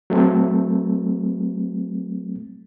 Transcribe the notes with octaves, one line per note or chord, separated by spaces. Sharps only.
F#3 A3 C4